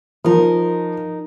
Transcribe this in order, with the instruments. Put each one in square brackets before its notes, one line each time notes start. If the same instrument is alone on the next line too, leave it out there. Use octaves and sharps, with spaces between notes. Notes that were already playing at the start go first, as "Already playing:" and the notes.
[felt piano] F3 [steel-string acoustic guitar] D#4 A#4